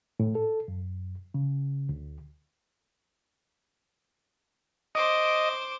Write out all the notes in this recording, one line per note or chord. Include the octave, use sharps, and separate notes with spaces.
A2
A4
F#2
C#3
D2
C5 D#5 D6